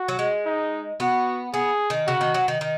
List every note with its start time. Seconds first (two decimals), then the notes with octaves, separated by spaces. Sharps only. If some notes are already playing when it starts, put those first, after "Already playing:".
Already playing: F#4
0.08 F#3
0.19 G#3
0.46 D#4
1.00 B3 F#4
1.54 B3 G#4
1.90 D#3
2.07 C#3 F#4
2.21 D#3
2.34 F#3
2.48 D#3
2.61 D#3